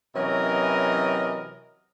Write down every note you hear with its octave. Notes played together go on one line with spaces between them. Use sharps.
C3 E3 F#3 C#4 A#4 D#5